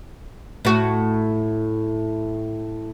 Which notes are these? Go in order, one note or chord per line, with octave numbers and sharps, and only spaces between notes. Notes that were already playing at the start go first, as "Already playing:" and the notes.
A2 F#4